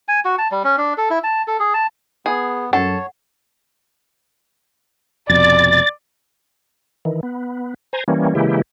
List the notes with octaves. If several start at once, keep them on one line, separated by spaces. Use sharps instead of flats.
G#5
F#4
A5
G3
C#4
D4
A4
E4
A5
A4
G#4
A5
B3 G#4
F#2 A4 C#5 F#5
F1 F2 B2 D5 A6
D#3 E3
B3
C5 G#5 A#5
E3 G3 A#3 C#4
C#3 E3 G#3 A#3 E4 G4